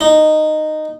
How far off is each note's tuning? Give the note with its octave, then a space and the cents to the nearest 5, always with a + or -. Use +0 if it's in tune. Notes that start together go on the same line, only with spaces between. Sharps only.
D#4 -10